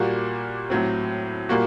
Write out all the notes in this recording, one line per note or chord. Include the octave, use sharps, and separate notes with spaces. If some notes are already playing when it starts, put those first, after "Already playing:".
Already playing: A#2 G3 A#3 F#4
A2 F#3 C4
A#2 G3 A#3 F#4